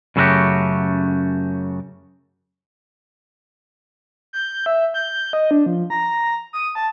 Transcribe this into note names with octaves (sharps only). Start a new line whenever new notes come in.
F#2 C#3 A3 E4 F#4 G4
G6
E5
G6
D#5
D4
F3
A#5
D#6
A5